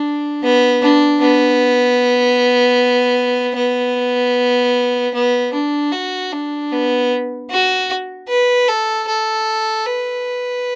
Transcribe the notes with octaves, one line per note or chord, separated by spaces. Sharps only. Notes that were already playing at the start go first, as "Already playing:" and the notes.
Already playing: D4
B3
D4
B3
B3
B3
D4
F#4
D4
B3
F#4
B4
A4
A4
B4